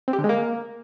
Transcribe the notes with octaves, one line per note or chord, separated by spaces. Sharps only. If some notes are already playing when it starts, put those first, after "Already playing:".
C4
G4
D3
G#3
A#3